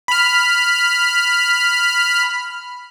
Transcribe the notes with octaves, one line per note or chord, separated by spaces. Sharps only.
B5 F6